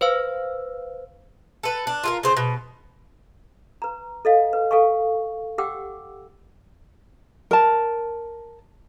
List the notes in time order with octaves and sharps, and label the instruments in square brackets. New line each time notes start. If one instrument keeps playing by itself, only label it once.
[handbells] B4 C5 F5 E6
[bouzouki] A4 B4
D4
F4 G#4 A#4
C#3 C5
B2
[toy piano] B4 A#5
A4 D#5 F5
B4
A4 F5 G#5 C#6
G4 F#5 G5 D6 E6
[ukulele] A#4 A5